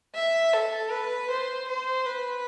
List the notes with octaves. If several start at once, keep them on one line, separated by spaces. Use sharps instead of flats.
E5
A4
B4
C5
C5
B4